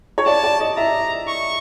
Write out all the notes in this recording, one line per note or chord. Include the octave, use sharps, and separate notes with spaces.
C#5
D5 A5
D5
D#5
E5 A#5
C#6